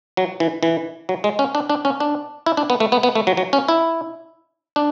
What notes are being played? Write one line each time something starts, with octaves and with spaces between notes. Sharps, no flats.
F#3
E3
E3
F#3
G#3
C#4
D4
D4
C#4
D4
E4
D4
B3
A3
B3
B3
A3
F#3
F#3
C#4
E4
D4